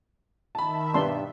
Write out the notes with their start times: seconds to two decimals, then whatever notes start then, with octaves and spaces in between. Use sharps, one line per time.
0.55 D#3 E5 A5 B5
0.94 G2 B2 G3 B3 D5 A5 C6